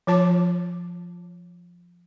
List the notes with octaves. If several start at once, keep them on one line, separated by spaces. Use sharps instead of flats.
F3 F4 C#5 A5 D6